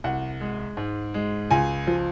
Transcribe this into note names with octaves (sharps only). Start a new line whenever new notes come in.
C2 F#5
G#3
G#2
G#3
C#2 G#5
F3